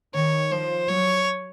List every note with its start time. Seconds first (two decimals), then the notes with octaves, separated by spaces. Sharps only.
0.15 D#3 C#5
0.51 F3 C5
0.88 F#3 C#5